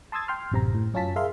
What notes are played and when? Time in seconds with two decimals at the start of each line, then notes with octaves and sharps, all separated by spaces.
0.12 A5 C6 D#6 E6 G#6 A6
0.28 G5 C6 F6
0.51 A1 F#2 C3 C4 A#5
0.74 A2
0.94 F#2 C#4 F4 A5 B6
1.16 G#4 A#4 E5 F5 C6